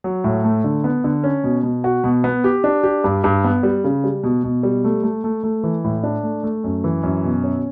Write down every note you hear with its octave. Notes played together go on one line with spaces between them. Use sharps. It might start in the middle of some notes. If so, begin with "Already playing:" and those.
F#3
A2
A3
D3
B3
D3
C#4
B2
B2
F#4
B2
B3
G4
D4
G4
G2
G2
B3
G3
C#3
G3
B2
B2
G3
A3
A3
A3
A3
E3
A2
D4
A3
A3
F#2
E3
F#2
B2
C#4